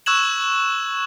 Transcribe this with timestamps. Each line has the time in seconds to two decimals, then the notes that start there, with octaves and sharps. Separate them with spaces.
0.06 C#6 E6 F#6 G#6 E7 F#7